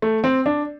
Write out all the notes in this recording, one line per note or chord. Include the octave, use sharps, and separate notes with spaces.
A3
C4
D4